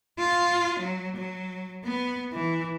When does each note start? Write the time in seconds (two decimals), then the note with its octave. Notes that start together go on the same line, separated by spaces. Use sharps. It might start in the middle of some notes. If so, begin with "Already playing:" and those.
0.19 F4
0.80 F#3
1.16 F#3
1.84 B3
2.33 E3